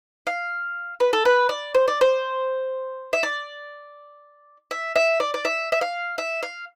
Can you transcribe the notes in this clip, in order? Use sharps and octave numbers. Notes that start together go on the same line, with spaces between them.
F5
B4
A4
B4
D5
C5
D5
C5
E5
D5
E5
E5
D5
D5
E5
E5
F5
E5
F5